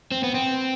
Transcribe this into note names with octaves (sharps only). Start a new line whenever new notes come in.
C4
B3
C4